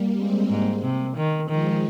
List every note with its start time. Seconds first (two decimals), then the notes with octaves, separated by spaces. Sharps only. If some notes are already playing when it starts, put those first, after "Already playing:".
Already playing: G3 A#3
0.16 G#3 C4
0.49 G#2 G3 A#3
0.83 C3
1.17 D#3
1.50 D#3 F3 G#3